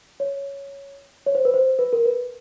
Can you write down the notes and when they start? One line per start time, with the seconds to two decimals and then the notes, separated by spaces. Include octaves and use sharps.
0.20 C#5
1.26 C#5
1.35 C5
1.45 B4
1.54 C5
1.79 B4
1.93 A#4
2.05 B4